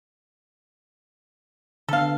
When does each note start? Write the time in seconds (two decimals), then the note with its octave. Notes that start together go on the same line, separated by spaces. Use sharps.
1.89 D3 B3 A4 F5